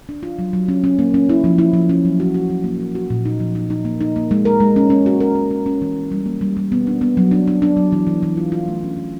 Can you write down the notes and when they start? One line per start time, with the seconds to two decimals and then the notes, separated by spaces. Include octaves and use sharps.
0.09 D4
0.23 F4
0.39 F#3
0.53 F#3
0.68 C#4
0.84 C#4
0.99 A#3
1.14 C#4
1.29 E4
1.44 F3
1.58 E4
1.73 F3
1.89 C#4
2.05 F#3
2.20 F#4
2.34 F#4
2.50 F#3
2.64 A#3
2.80 F#4
2.95 F#4
3.10 A#2
3.25 D#4
3.40 F3
3.55 D#4
3.70 D#4
3.85 A#3
4.01 D#4
4.16 A#3
4.31 G#3
4.45 A#4
4.60 G#3
4.76 C#4
4.90 C#4
5.06 F#4
5.20 A#4
5.35 C#4
5.51 C#4
5.66 C#4
5.82 E3
5.97 A#3
6.12 G3
6.26 A#3
6.41 G3
6.57 G3
6.72 B3
6.87 D4
7.01 B3
7.17 F#3
7.31 D4
7.48 D4
7.62 D4
7.77 F#3
7.92 E3
8.07 E3
8.23 E3
8.37 F4
8.52 F4
8.68 A3
8.83 C#4
8.97 E3